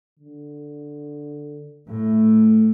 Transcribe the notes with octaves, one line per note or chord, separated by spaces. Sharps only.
D3
A2 A3